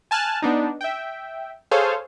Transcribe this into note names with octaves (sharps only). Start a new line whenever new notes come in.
G#5 A5 F6 F#6
B3 D4 D#4
E5 G5
G#4 A4 C5 C#5 F5 G#5